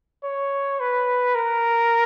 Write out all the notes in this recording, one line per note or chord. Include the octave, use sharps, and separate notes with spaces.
C#5
B4
A#4